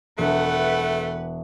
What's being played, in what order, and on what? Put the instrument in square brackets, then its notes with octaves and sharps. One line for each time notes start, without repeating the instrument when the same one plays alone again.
[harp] E1 [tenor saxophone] A3 [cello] B4 F#5